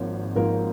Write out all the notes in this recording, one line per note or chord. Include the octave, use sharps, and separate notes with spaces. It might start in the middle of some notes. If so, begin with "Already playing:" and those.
Already playing: G#1 G#2 F3 A#3 C#5
G#1 G#2 F3 A#3 A#4